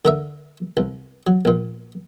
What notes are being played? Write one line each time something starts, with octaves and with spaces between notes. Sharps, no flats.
D3 A#4 E5
C2
F#3
A#1 A#2